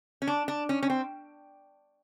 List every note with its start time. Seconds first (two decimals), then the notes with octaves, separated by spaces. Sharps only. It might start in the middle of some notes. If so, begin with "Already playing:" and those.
0.22 C#4
0.27 D4
0.48 D4
0.69 C#4
0.83 C#4
0.90 C4